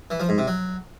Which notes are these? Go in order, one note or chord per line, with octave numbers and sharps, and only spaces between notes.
E3
F3
G#2
C3
F#3